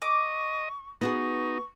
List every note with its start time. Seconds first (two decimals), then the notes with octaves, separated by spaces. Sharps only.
0.02 D#5 C#6 D6
1.01 B3 D#4 F#4 G#4 C#6